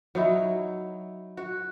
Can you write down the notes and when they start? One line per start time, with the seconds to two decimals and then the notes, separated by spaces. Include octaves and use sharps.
0.15 F#3 D#4 E4
1.37 F#4